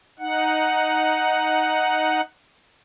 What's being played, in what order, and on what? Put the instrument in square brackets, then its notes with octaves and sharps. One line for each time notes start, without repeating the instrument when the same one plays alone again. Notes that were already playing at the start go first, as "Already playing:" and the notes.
[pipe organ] D#4 F#5